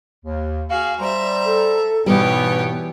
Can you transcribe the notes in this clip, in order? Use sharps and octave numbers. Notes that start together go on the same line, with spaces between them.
D#2
F#4 G#4 F5
G3 C5 E5 A#5
A4
G#2 B2 E3 G3 B3 G4 C#5